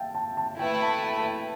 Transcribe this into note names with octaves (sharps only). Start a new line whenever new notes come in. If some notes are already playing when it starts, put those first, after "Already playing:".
Already playing: E5 F5 G5 A5
A5
A5
A3 E4 B4 G5
A5
G5
A5
G5